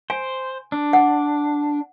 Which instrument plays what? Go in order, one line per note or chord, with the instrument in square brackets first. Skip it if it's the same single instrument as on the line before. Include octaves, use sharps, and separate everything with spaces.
[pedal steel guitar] C5 [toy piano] G#5
[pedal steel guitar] D4
[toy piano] F#5